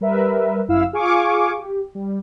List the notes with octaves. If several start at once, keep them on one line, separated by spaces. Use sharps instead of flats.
G3 A#4 B4 E5
G1 F#2 E4 F5 E6
F4 G#4 F5 G#5 C#6 D6
G4
G3